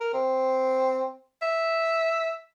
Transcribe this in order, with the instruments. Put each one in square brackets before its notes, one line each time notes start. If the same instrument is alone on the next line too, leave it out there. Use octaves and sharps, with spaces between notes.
[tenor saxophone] A#4
C4
E5